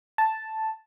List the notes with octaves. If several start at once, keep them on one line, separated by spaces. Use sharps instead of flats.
A5